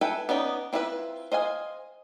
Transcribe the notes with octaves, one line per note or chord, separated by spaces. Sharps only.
A4 B4 E5 G5 G#5
B3 C#4 D#4 D5
C4 E4 F4 G#4 B4
C5 D#5 F5 G#5